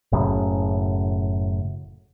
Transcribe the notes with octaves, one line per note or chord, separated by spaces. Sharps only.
F#1 F#2 A2 C#3